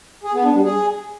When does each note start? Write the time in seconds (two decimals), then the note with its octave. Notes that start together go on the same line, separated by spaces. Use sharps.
0.24 G#4
0.34 B3
0.44 D4
0.54 G3
0.64 G#4